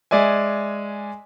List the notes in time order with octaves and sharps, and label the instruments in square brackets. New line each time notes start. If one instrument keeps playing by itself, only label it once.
[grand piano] G#3 D5 E5 G#5